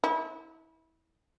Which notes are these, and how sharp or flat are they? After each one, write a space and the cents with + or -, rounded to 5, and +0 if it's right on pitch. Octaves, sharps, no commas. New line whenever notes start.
E4 -25